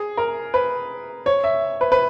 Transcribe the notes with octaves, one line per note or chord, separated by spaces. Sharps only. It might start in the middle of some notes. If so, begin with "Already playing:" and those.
Already playing: G#4
A#4
B4
C#5
E5
B4
B4